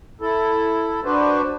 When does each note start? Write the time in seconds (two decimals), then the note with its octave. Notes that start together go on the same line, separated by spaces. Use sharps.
0.21 E4 A4
1.05 D4 F#4 B4 C5